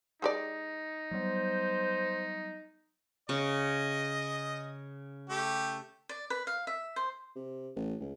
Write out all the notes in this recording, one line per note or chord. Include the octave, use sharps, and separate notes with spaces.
G#3 D#4 G4 D5
F#3 G3 B3 C5
C#3 D#5
A3 G4
D5
B4
F5
E5
C5
C3
A1
C#2